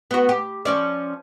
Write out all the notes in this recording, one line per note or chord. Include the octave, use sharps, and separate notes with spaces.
B3 F#4
G4
F3 C#4 D5